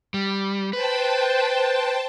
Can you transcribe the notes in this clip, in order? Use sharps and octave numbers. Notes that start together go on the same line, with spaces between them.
G3
B4 C5 G5 A5